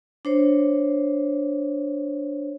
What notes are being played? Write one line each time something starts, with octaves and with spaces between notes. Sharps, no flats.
D4 C5 C#5